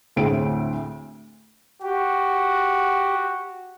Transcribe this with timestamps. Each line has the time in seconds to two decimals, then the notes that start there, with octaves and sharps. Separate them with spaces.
0.16 D2 A2 G#3 C4 D7
1.82 F#4 G4